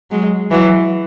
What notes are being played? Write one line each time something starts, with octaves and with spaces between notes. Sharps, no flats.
F#3 G#3
E3 F#3